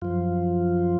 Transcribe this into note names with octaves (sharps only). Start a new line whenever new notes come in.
F#2 F3 F4